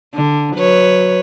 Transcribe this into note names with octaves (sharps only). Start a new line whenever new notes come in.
D3
F#3 B4 C#5